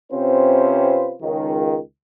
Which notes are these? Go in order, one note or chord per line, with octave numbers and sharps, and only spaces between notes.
C3 C4 C#4 F4 B4 C5
C#2 D#3